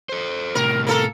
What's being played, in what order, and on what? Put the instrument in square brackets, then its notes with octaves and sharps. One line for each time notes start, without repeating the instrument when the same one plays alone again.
[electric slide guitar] A4 C5
[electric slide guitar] A2 C3 [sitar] A#4
[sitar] A#3 A4 A#4